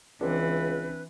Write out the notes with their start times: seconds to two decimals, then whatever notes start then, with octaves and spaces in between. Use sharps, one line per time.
0.21 C#2 E3 C4 D4 B4